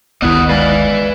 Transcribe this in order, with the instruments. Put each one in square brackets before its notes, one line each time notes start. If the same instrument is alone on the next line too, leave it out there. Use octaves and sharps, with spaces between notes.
[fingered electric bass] G1 D2 D#3 [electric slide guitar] B3 E4 [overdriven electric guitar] D#5 F#5
[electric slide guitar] G#3 D5 F5 [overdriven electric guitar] B4 G#5